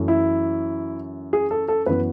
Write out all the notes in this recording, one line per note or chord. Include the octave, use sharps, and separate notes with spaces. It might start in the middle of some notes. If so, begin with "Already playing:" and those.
Already playing: F#2 E3 A3
E4
G#4
A4
A4
F#2 E3 B3 B4